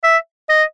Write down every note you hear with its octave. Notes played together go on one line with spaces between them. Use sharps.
E5
D#5